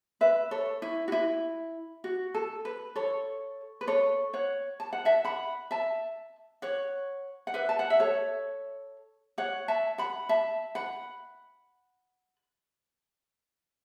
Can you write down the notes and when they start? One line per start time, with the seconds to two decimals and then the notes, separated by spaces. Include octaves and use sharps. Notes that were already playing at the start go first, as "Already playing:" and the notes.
0.21 B4 E5
0.51 A4 C#5
0.82 E4
1.08 F#4
1.12 E4
2.04 F#4
2.34 A4
2.65 B4
2.96 A4 C#5
3.81 B4
3.87 A4 C#5
4.33 C#5 F#5
4.80 A5
4.93 F#5
5.05 E5 A5
5.25 F#5 B5
5.71 E5 A5
6.62 C#5 F#5
7.47 F#5
7.54 B4 E5
7.69 A5
7.79 F#5
7.90 E5
8.00 A4 C#5
9.38 C#5 F#5
9.68 E5 A5
9.98 F#5 B5
10.29 E5 A5
10.75 F#5 B5